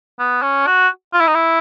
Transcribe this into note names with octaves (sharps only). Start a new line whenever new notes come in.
B3
C#4
F#4
F4
E4
D#4
E4